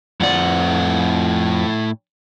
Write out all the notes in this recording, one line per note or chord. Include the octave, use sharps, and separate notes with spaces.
F2 A2 D5 F#5